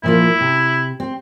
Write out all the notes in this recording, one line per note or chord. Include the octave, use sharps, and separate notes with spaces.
A#2 F3 A#3 E4
C3
C4